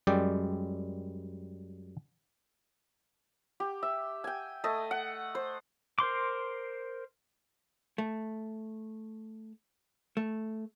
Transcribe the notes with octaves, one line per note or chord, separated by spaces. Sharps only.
F#2 G3 G#3 D5 G5
G4
E5
G5 G#5
A3 D#5
F#5
C5
A#4 C5 C6 D6
A3
A3